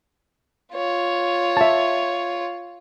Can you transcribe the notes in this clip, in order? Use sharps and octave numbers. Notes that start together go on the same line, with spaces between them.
F4 C#5
E5 A5